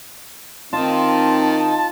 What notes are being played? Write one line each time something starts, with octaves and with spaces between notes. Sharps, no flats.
D#3 C4 D#4 F4 A5